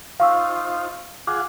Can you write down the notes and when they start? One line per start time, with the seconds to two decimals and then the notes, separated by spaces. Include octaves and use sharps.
0.20 D#4 F4 C5 F5 C#6 E6
1.27 F4 G#4 F#5 D6